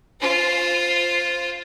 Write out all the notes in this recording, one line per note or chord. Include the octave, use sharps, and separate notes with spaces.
F4 C5